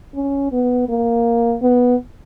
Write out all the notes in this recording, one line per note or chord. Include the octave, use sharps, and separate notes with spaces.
C#4
B3
A#3
B3